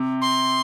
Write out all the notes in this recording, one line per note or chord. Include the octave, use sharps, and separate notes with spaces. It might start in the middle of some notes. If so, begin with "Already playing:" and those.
Already playing: C3
C6